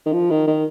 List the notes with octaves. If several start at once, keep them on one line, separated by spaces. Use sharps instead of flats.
D#3
F3
D#3
D#3